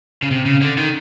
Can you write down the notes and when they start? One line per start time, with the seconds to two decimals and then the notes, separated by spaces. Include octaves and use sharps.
0.22 C#3
0.31 C3
0.46 C#3
0.62 D3
0.77 D#3